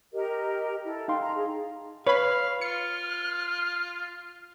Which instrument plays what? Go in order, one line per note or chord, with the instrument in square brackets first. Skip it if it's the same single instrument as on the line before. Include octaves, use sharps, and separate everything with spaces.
[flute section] G4 A#4 D#5
E4 A4
[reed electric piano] D#4 F5 C6 [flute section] G5
[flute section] A#5
G#4
[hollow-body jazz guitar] B4 [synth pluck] C#5 B5 [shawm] F5
[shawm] F4 [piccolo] F6 [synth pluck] C#7